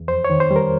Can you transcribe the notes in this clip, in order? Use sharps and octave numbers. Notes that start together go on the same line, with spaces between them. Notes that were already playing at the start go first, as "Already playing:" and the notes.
Already playing: E2
F2 C5
C#5
D#3
C5
G3
A#4